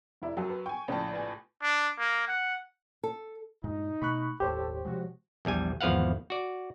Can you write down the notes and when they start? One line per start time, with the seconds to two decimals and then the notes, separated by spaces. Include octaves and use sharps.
0.22 F1 E4 D5
0.37 F#2 F#3 G5 A5
0.50 B4
0.66 G5 G#5 C#6
0.88 A#1 A2 C#3 C#4 A5
1.13 B4 G#5
1.62 D4
1.98 A#3
2.28 F#5
3.03 A4
3.64 G2 A#2 G#3 D#4
4.02 B2 A3 B5 C#6 F#6
4.40 F#1 D#2 A2 G4 A4 C5 C#5
4.85 C3 F3 G3 G#3 F#4
5.45 A#1 E2 G3 G#5
5.81 G#1 E2 F3 B4 F5 F#5
6.30 F#4 D5